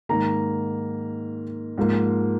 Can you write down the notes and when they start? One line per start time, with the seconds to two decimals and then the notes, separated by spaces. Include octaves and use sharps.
0.09 G#2 D#3 A#3 A#5
1.78 G#2 F3 A#3